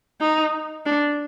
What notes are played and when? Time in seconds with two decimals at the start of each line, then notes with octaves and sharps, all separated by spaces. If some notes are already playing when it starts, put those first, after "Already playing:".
0.21 D#4
0.86 D4